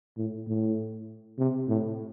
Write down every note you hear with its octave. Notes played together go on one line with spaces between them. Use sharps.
A2
A2
C3
A2